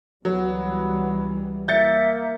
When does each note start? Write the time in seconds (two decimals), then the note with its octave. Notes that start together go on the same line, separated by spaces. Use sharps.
0.25 C#2 E3 F#3 G3 B3
1.68 A#3 E5 G6 A6 C#7